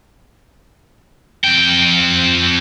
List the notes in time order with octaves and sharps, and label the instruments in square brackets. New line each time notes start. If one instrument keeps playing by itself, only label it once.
[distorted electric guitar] F2 G5